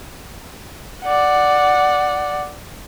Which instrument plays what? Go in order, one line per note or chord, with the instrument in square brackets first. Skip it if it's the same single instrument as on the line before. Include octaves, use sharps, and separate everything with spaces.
[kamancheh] D5 F#5